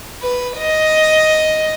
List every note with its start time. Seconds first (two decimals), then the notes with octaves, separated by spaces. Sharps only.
0.22 B4
0.57 D#5